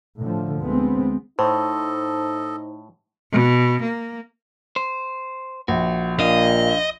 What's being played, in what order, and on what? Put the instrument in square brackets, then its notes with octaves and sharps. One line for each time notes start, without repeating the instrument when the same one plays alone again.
[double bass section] A2 D3 F3
D2 G#3 B3 C4
[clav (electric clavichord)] A2 [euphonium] D#4 [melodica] A4 D#5 [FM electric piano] C5
[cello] B2
A#3
[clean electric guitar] C5
[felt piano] A#1 [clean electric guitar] F#4
[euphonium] A#2 [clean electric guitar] D4 F5 [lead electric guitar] D#5